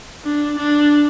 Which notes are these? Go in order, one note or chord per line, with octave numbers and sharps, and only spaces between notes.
D4
D4